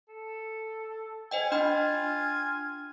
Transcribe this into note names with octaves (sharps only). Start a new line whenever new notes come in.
A4
C5 D#5 G5 G#5
D4 F4 G5 B5